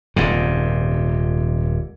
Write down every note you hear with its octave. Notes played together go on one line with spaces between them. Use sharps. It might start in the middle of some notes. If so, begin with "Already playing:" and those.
D#1 G#2 C3